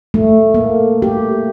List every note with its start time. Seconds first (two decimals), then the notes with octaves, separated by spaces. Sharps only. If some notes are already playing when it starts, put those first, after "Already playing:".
0.14 A3
0.54 A#3
1.02 G4